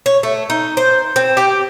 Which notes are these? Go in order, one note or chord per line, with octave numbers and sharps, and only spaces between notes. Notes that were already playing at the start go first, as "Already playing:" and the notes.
C#5
A3
D#4
C5
C4
G4